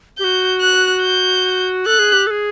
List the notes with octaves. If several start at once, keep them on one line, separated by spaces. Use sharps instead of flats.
G4 G6
F#4
F#6
G6
A4 F#6
G#4
G4
A4
G#4